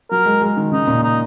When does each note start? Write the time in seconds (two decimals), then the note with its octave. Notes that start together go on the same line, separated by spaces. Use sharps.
0.11 F#3 A#4
0.26 G#3
0.42 G#3
0.57 D#3
0.72 C#3 D#4
0.87 A#2
1.04 D#4